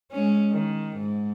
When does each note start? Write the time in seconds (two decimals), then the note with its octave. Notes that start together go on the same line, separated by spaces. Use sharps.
0.12 G#3 C#4
0.51 D#3
0.97 G#2